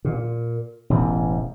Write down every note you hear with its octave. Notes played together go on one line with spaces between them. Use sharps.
A#2
E1 A1 E2